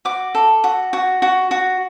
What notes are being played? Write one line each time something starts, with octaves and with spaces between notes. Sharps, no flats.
F#4 D6
A4
F#4
F#4
F#4
F#4